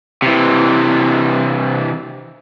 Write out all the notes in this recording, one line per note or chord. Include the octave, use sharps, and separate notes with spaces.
C3 E3